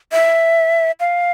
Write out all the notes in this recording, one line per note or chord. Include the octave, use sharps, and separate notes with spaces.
E5
F5